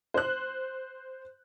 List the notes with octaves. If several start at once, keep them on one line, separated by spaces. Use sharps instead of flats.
C5 F#6